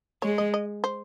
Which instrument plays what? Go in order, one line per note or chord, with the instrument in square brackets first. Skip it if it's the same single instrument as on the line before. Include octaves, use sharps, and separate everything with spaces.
[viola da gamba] G#3 [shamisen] C#5
[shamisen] D#5
D#5
C5